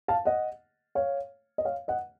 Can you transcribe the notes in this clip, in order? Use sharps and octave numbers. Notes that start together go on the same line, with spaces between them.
F5 A5
D#5 F#5
C#5 F5
D#5
C#5 F5
D#5 F#5